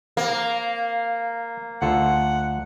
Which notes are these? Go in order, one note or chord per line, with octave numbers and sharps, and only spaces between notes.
A#3 C4
D2 F4 A4 F#5